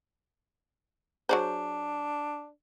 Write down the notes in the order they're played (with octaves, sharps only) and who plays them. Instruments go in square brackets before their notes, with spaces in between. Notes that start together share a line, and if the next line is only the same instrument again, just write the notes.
[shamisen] F#3 G#4 C5 [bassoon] D4